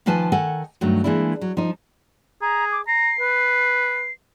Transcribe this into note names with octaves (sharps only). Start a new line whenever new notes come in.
D#3 F3 F4 B4 G#5 A5
D#3 A4 F#5 G#5
G2 D#3 F#3 A3
E3 G#3 A#3 D4 E4
F#3
F3 D#4
G#4 A#5
D6
A#5 C7
B4